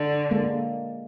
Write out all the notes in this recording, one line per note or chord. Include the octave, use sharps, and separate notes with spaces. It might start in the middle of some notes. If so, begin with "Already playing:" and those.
Already playing: D3
G#3 A#3